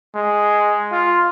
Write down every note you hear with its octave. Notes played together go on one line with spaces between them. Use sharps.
G#3
F4